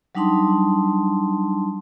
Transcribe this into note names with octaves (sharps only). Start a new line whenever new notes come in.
F#3 G3 D4 D#4 A5 C6